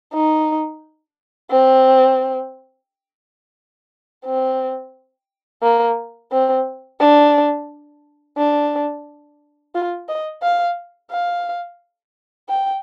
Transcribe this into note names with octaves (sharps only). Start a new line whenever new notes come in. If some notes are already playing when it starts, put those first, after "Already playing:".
D#4
C4
C4
A#3
C4
D4
D4
F4
D#5
F5
F5
G5